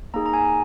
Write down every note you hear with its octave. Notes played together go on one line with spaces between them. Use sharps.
A#3 D#4 G#4 A#5
A#5
G#5